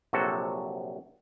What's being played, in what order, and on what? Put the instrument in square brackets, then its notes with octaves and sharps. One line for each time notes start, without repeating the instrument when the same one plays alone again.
[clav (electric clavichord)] A#1 C3 F#3 F#4 A4